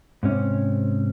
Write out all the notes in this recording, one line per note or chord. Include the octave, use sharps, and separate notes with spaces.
G#2 C3 C#4